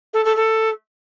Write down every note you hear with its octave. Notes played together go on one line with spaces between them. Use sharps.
A4
A4
A4